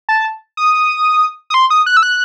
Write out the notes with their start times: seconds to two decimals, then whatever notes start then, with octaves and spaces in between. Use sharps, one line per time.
0.09 A5
0.57 D#6
1.50 D#6
1.54 C6
1.70 D#6
1.86 F#6
1.97 E6
2.03 F#6